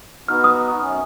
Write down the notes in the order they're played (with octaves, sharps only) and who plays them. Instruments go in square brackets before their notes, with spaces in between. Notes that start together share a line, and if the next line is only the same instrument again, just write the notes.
[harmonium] B3 D#4 F#4 [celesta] F6
[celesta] D#6
[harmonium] F#2 C#4